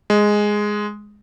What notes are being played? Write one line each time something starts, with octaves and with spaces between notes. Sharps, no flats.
G#3